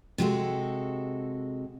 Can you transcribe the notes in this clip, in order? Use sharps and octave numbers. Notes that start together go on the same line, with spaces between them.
C3 G#3 F#4 A4